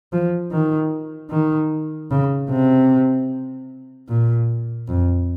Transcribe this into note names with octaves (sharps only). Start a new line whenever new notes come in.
F3
D#3
D#3
C#3
C3
A#2
F2